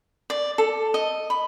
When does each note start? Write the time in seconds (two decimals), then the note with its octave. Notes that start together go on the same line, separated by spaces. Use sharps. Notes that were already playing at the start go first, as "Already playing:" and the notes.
0.30 D5
0.58 A4
0.94 D#5
1.30 B5